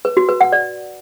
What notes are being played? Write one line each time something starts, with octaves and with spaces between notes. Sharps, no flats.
B4
F#4
B4
F#5
D5